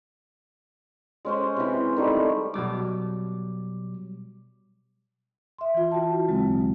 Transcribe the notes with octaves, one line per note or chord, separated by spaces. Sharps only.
G#3 C#4 C5
C3 E3
D#3 G3 A3
B2 F#3 G3 D6
E5 C6
E3 F4
E4 F#4 G5 A5
D2 C#3 F#3 G#3 C4
B2